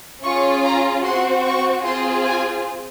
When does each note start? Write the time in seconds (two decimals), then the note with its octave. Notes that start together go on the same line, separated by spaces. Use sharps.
0.24 C#4 F4 G#4 C#6
0.64 A#5
1.04 C4 F#4 C6
1.44 C#6
1.84 C4 F4 G#4 C6
2.24 G#5